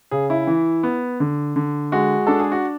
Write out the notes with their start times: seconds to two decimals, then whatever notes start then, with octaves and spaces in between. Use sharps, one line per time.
0.11 C#3 G#4
0.30 E4
0.47 E3
0.83 B3
1.20 D3
1.56 D3
1.92 G#3 F#4
2.27 D4 A4
2.39 G#4
2.52 F#4